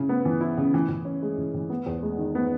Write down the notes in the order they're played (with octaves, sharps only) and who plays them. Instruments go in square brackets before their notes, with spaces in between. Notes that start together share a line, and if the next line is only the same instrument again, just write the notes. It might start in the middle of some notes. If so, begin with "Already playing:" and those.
Already playing: [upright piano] C#3 E4
B3
E3
E4
C#3
E3
E3
C#4
G#3
E3
E3
B3
E2
G#3
D#3
B3